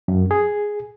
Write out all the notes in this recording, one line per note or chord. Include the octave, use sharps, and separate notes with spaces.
F#2
G#4